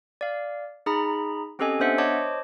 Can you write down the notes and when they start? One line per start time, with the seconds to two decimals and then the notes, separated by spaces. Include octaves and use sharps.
0.21 D5 F5
0.86 D#4 G#4 A#5 B5
1.59 C4 C#4 G4 A4 D#5 G#5
1.80 B3 D4 C5 E5 F#5
1.98 C5 C#5 D#5 A5 D6